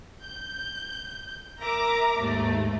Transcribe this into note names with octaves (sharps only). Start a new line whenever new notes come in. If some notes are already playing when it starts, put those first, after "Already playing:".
G6
A#4 E5 A#5 D6
D#2 G#2 A3